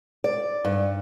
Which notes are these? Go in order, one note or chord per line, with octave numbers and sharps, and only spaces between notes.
D5
G2